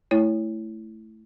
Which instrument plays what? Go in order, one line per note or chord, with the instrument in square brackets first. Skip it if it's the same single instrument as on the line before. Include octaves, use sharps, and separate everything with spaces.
[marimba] A3 E4 C#5